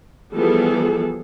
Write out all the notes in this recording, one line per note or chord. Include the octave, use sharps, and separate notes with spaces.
E3 F3 G3 B3 G#4 A4